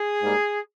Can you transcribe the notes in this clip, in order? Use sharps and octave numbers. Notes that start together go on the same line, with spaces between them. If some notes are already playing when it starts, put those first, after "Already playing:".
Already playing: G#4
G#2 G3 A#3